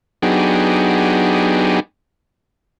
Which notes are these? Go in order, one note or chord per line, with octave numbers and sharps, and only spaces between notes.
F#3 B3 D4 D#4 G4 G#4